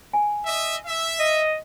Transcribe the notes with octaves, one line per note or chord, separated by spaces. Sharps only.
G#5
D#5 E5
E5
D#5